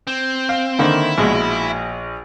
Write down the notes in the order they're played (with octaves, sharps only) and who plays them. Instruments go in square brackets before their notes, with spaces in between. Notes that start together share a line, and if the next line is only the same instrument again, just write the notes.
[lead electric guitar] C4
[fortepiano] F5
[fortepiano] D3 C4 [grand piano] D#3 A#3 [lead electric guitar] E4
[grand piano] A#1 [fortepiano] B2 G#3